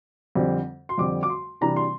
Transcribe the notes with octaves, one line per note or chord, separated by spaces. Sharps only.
F2 D3 G3 C4
C6
F2 D3 G3 C4 D6
D6
C6
C3 E3 G3 D4 A#5
C6